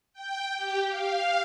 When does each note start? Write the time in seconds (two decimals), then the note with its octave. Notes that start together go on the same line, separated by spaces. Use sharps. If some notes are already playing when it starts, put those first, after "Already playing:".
0.13 G5
0.57 G4
0.87 F5